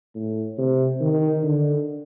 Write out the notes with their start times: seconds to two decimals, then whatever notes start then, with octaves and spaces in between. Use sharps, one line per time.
0.15 A2
0.58 C3
1.00 D#3
1.43 D3